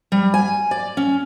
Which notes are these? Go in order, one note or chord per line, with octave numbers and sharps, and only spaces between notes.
G3
G#5
D5
C#4